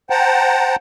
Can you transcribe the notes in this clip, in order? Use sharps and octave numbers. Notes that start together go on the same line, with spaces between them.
C5 F#5 G5 A5 A#5